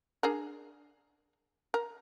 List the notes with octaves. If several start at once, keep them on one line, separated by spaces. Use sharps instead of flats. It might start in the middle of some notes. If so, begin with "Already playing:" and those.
D4 G#4 A#4
A#4